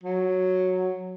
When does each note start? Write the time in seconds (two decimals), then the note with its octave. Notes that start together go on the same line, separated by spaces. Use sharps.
0.03 F#3